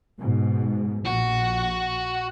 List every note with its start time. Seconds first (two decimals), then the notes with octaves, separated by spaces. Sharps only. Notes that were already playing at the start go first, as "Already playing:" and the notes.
0.19 G#2 B2
1.05 A#1 F#4